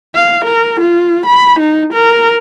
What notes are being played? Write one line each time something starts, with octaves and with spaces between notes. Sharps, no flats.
F5
A#4
F4
B5
D#4
A#4